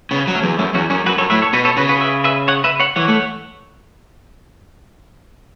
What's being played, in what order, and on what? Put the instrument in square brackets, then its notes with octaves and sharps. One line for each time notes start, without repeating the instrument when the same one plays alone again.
[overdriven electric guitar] C#3 [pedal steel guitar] B3
[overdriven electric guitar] F#3
[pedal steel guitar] A3 C#4
[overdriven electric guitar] E2
[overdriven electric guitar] F#2 [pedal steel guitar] A3 C#4
[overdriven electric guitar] E2 [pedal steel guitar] C#4 F#4
[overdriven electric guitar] F#2 [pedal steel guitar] C#4 F#4
[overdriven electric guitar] F#2 [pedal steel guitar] F#4 B4
[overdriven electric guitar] F#2 [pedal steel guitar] A4 C#5
[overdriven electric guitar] A2 [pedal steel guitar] B4 E5
[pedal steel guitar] A4 C#5
[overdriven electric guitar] B2 [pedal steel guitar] F#4 B4
[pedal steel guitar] A4 C#5
[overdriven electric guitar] C#3 [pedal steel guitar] F#4 B4
[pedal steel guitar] F#4 B4
B4 E5
B4 E5
C#5 F#5
B4 E5
C#5 F#5
[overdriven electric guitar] E3 [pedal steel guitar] C#5 F#5
[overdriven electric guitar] A3